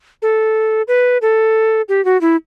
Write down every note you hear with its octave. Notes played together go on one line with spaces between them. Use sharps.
A4
B4
A4
G4
F#4
E4